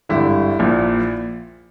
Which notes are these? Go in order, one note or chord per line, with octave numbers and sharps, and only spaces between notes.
G#1 G2 D3 E4
A#1 A#2